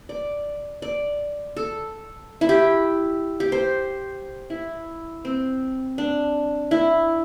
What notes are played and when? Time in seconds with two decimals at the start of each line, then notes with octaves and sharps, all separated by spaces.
0.09 D5
0.82 D5
1.56 A4
2.41 E4
2.49 G4
3.40 G4
3.52 C5
4.50 E4
5.25 C4
5.98 D4
6.71 E4